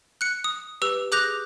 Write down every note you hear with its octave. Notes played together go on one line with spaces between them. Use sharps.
F#6 C#7
D#6
G4 B4 E6 F7
G#4 D6 F#6 G6 A#6 F7